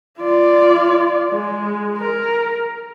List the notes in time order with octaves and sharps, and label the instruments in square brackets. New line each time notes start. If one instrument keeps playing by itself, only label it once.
[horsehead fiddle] F4 D5
G#3
A#4